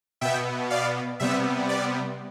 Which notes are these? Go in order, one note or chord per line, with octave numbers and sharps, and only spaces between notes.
B2 B3 E5 G5
D5 F5
C3 G3 B3 E5
D5